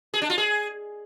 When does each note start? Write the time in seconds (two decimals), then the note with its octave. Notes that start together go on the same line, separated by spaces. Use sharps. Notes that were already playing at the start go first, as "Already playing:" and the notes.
0.14 G#4
0.22 D4
0.30 F4
0.38 G#4